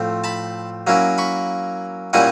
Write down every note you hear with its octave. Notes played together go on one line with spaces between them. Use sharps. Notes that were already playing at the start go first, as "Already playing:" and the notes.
Already playing: A2 F3 A3 C4
A5 B5
F#3 A#3 C#4 E4
B5 C#6
A#2 G3 A#3 C#4 E4 F#5 G#5